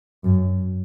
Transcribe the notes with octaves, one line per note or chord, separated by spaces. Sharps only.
F#2